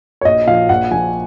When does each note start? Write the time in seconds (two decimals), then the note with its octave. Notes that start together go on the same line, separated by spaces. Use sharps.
0.21 C#5
0.25 A#1 D#5
0.47 A#2 F3 F5
0.69 A#1 F#5
0.91 A#2 F3 G#5